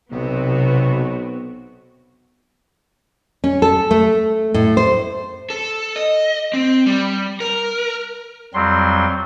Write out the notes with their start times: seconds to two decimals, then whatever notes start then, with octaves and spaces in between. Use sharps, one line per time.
0.12 B1 C3 B3 C4 F#4
3.44 C#4
3.62 A4
3.91 A3
4.54 A2
4.77 C5
5.50 A4
5.96 D#5
6.53 C4
6.86 G3
7.40 A#4
8.54 F2 F#3 G3 C4 C6